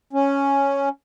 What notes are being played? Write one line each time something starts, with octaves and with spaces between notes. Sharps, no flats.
C#4